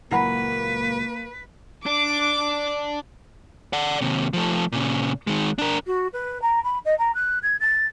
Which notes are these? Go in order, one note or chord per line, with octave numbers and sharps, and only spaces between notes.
C#2 A#2 F#3 A#3 E4 B4 F#5 B5
D4 D6
D5 F#5
D#2 C3
F3 A3
A#2 C#3
D#3 G#3
D4 A#4
F#4
B4
A#5
B5
D#5
A#5
F#6
G#6
A6